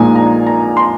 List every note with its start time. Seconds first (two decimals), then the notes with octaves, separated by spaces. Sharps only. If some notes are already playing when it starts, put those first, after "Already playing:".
Already playing: A#1 A#2 G#3 D#4 G#5
0.16 A#5
0.47 A#5
0.77 C6